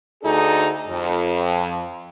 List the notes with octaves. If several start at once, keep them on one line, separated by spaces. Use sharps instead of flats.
D2 D4 D#4 G#4 A4
F2